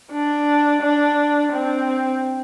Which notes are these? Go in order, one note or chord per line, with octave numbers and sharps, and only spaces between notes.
D4
D4
C4